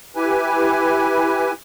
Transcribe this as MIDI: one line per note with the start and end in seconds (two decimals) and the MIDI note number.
0.16 1.53 64
0.16 1.53 67
0.16 1.53 71
0.16 1.53 80